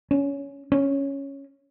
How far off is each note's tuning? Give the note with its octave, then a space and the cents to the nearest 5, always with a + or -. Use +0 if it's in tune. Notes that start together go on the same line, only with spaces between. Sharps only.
C#4 +15
C#4 +0